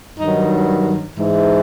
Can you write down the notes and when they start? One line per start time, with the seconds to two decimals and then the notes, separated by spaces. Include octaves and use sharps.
0.19 G2 D#3 F#3 D#4
1.16 G#2 E3